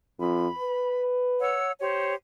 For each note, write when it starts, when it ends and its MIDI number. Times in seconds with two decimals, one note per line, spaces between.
0.19 0.47 41
0.19 1.02 83
0.59 1.60 71
1.40 1.71 73
1.40 1.71 78
1.40 1.71 88
1.80 2.14 67
1.80 2.14 72
1.80 2.14 73